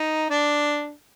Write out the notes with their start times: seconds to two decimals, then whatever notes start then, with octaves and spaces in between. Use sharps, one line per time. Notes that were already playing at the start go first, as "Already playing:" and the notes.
Already playing: D#4
0.30 D4